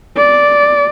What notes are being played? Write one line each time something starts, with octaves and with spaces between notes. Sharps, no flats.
D5